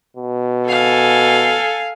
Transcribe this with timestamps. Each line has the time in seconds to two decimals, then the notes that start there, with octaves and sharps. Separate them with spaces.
0.16 B2
0.70 A4 F5 G#5